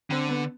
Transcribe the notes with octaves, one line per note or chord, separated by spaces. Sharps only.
D3 C4
B3